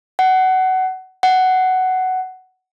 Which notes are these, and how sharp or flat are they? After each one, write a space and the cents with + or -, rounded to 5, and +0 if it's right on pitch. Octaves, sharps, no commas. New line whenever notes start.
F#5 +20
F#5 +10